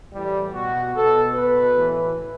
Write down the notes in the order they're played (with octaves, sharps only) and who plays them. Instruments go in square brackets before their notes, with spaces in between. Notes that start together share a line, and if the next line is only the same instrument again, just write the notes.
[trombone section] A2 E3 G3
B2 F#4
B2 A4
B2 B4
A2 E3